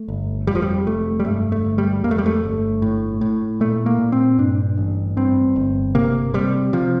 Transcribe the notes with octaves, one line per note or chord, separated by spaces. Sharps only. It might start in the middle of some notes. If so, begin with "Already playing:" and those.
Already playing: A3
G1
F2 G3
F3
G3
F1 A3
G3
G2 A3
A3
G1
G3
F2 A#3
A3
G3
A3
G1
A2
A2
A#2 A3
A#3
A#2
C4
G2 D4
A1
G2 C4
G1
C3 A#3
C3 G3
C3 F3